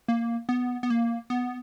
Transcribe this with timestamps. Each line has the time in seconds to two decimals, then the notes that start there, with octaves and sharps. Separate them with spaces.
0.08 A#3
0.49 B3
0.83 B3
0.90 A#3
1.30 B3